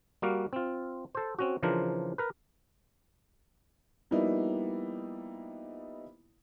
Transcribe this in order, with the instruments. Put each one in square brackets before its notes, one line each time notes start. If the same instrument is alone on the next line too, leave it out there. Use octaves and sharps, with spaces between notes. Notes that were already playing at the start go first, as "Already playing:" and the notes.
[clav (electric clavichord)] G3 A#3 F#4 F5
C4 F4
A4 C5
C4 C#4 F#4
C#3 E3 F3 D4 A#4 C5
A#4 B4
[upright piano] F3 G3 A#3 B3 D#4 E4